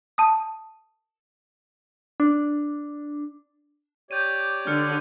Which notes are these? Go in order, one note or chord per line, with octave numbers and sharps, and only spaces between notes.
A5 D#6
D4
G4 C#5 D5 G6 D#7
D3 F6 C#7